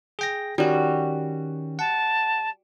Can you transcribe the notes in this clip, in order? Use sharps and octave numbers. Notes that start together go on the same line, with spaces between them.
G#4 G5 A#6
D#3 G3 C#4 F#4
F#5 A5